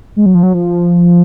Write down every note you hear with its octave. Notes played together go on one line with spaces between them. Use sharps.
G#3
F#3
F3
F#3
F3